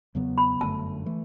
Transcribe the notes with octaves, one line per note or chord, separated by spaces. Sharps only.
E2 C#3 F#3 B3
B5
G1 F#2 D3 A3 A5
E3 A3